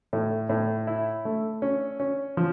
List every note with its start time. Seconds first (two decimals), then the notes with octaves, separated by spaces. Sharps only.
0.13 A2
0.49 A2
0.87 E4
1.25 A3
1.62 C#4
2.00 C#4
2.37 F3